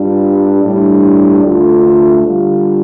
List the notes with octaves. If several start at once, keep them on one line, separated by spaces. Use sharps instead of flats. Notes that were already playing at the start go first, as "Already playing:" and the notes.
Already playing: G2 G3 D4 F4
A2 G3 D4
D2 D3 A3 F4
D3 G3 F4